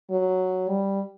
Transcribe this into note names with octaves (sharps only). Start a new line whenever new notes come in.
F#3
G3